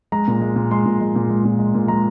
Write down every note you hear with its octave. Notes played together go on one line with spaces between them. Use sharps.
G#3 A#5
A#2
G#3
A#2
G#3 C6
A#2
G#3
A#2
G#3
A#2
G#3
A#2
G#3 A#5